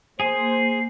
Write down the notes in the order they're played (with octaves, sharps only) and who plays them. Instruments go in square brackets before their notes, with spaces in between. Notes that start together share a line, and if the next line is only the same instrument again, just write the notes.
[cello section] A#3 [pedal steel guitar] G#4 G#5 [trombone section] C5 [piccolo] C7